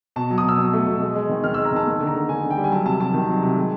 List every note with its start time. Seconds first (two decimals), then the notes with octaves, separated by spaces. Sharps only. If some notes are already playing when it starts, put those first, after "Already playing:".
0.16 B2 A5
0.30 F#3
0.38 D#6
0.44 B2 E6
0.58 B2
0.73 A3
0.87 B2
1.02 G#3
1.16 G#3
1.29 D#3
1.44 D#3 F6
1.54 G#3 E6
1.65 A#5
1.72 D#3 A5
1.87 A#3
2.00 D3
2.07 A#5
2.14 D3
2.29 D3 G#5
2.43 D3
2.51 G5
2.57 G3
2.64 G#5
2.71 F#3 A5
2.86 C3 A5
2.99 C3 A5
3.14 D#3
3.29 F#3
3.42 C3
3.57 G#3